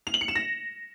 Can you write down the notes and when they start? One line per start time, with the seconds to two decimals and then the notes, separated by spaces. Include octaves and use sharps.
0.07 F7
0.14 F#7
0.21 C#7
0.28 E7
0.35 A#6